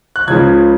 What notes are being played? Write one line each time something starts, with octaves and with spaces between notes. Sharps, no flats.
F#6
C#2 C#3 F3 G#6